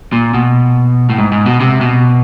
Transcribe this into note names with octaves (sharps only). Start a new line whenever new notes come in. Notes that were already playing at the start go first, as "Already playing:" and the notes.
A#2
B2
A2
G#2
G#2
B2
C3
B2